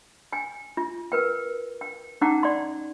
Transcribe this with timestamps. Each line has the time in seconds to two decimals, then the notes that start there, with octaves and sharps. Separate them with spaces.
0.33 G5 G#5
0.77 F4
1.12 A#4 B4 G5
1.81 G5
2.21 C#4 D#4 F#5 G5 A#5 D6
2.43 D5 F#5 C6